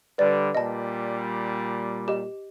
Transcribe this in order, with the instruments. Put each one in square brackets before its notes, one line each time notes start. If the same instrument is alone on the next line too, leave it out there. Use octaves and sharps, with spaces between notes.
[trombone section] D3 G3 [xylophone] B4 D5
[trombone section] A#2 G3 [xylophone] D#5 A5
[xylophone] G4 D#5